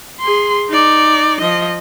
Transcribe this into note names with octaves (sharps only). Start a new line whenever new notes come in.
G#4 C6
D#4 D5
F3 D#5